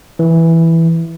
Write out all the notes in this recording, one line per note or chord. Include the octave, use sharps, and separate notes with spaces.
E3